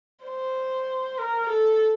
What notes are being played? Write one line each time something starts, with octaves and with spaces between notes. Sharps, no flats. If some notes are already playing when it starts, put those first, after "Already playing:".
C5
A#4
A4